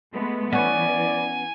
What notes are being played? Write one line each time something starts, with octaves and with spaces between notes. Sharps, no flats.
G#3 A3 B3
E3 B3 C#4 D5 G#5